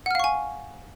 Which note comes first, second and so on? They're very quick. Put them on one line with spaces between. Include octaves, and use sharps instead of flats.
F#5 F6 F5 C#6 G#5